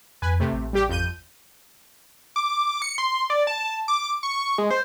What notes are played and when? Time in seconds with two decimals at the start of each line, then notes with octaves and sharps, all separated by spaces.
0.22 F2 B4 G#5
0.40 C3 A3
0.52 A1
0.73 G3 G4
0.89 F2 G6 D#7
2.36 D6
2.82 C#7
2.98 C6
3.30 D5
3.47 A5
3.88 D6
4.23 C#6
4.58 G#3
4.70 C5